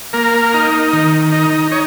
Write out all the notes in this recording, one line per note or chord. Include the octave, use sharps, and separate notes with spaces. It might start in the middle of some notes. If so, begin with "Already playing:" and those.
A#3 A#4
D#4
D#3
D#4
D#4 C#5